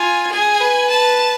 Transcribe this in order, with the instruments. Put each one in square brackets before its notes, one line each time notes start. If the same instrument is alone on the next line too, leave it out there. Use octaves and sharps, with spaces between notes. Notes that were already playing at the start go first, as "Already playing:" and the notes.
Already playing: [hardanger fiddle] F4 [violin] G#5
[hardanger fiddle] G#4 [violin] G#5
[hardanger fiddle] B4
[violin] A5